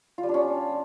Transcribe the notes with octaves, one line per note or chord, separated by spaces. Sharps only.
F4
G3
D4
C#4